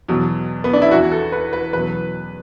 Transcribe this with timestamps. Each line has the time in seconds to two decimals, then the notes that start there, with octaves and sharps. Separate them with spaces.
0.08 E2 B2 F#3
0.64 B3
0.73 D4
0.82 E4
0.91 E2 E3 F#4
1.12 A4
1.32 B4
1.53 B4
1.73 E2 B2 F#3 B4